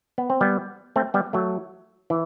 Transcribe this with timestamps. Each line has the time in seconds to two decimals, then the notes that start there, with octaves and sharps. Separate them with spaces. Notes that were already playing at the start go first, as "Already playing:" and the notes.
0.18 B3
0.30 C4
0.41 G3 B3
0.96 A3 C4
1.14 G3 B3
1.33 F#3 A3
2.10 E3